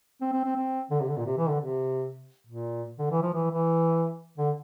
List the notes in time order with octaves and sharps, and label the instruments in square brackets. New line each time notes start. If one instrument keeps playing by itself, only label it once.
[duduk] C4
C4
C4
C4
D3
C3
D3
A#2
C3
E3
D3
C3
A#2
D3
E3
F3
E3
E3
D3